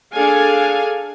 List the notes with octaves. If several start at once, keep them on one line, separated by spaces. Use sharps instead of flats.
D4 G#4 A4 F5 G#5